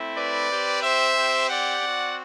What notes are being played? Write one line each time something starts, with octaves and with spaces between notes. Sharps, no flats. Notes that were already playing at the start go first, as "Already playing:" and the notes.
Already playing: A3 C4 E4
B4 D5
C4 G4
C5 E5
C4 G4
D5 F#5
C4 F#4